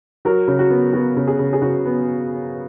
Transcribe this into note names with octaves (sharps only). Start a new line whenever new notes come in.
F#3 F#4 A#4
C#3
F#4
B3
B3 F#4
C#3
G#4
C#3
G#4
C#3 F#4
B3